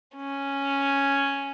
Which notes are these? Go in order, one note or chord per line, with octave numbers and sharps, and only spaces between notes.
C#4